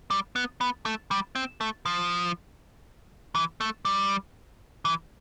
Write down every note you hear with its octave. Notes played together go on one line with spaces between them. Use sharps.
G3
B3
B3
A3
G3
C4
A3
F3
E3
A3
G3
E3